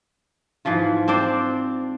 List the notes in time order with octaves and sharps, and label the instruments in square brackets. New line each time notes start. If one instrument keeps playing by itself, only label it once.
[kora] G#2 E3 F3 F4
C4 D4 C5 D5